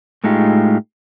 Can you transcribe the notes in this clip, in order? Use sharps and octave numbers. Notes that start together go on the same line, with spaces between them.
A2 G#3 A3 D#4 F4 G4